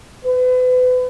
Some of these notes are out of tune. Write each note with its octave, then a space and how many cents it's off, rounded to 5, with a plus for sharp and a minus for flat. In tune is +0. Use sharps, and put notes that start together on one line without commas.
B4 +35